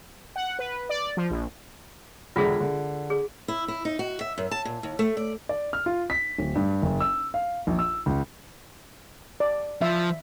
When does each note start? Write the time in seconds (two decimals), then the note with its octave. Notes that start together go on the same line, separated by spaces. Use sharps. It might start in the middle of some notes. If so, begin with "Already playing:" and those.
0.36 F#5
0.59 B4
0.89 D5
1.17 F3
1.30 A#1
2.36 E1 D3 F4 G#4 E5 B6
2.60 D3
3.10 G#4
3.48 E4
3.68 E4
3.85 D#4
3.99 F#4
4.21 E5
4.38 F#2
4.51 A5
4.65 A#2
4.83 D#2
4.99 A3
5.17 D5
5.49 D5
5.73 F6
5.86 F4
6.10 B6
6.39 D1
6.55 G2
6.82 F#1
7.00 E6
7.34 F5
7.67 A#1
7.79 E6
8.06 C#2
9.40 D5
9.82 F3 E5